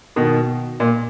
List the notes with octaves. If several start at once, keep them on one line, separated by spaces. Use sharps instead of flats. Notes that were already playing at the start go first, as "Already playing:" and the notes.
B2 D#3
A#2